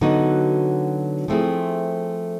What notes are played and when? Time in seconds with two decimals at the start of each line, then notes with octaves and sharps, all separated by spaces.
0.01 D3 F#3 B3 D#4 F#4
1.28 F3 A3 C4 E4 G#4